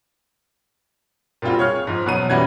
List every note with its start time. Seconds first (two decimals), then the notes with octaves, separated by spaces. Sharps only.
1.42 A#2 G3 C4 F4 F#4
1.58 G#4 C#5 C#6 F6
1.87 G#2 F3
2.05 E1 B2 F#3 F#5 D#7
2.30 E2 G3 C#4 E4 F#4 G#6